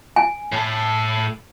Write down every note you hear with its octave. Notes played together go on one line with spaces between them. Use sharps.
G#5
A2 A4